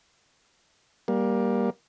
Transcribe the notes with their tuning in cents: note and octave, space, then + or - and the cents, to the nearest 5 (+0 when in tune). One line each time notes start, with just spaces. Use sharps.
G3 +0 A#3 +20